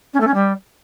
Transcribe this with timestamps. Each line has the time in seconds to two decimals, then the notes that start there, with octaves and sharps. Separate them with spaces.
0.13 C#4
0.20 A3
0.27 C#4
0.34 G3